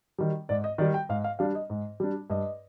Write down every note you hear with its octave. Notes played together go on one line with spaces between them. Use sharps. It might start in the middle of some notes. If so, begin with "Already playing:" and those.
D#3 G3
G#2 D5
D#5
D#3 G3 D5
G5
G#2 F5
F5
G3 D4 F5
D#5
G#2
G3 D4
G2 D#5